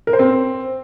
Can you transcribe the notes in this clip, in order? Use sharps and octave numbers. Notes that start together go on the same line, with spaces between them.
A#4
C5
C4